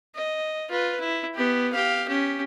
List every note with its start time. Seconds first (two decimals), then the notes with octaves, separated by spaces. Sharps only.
0.15 D#5
0.70 F4 B4
1.00 E4
1.35 B3 G4
1.72 G4 F5
2.07 C#4 G4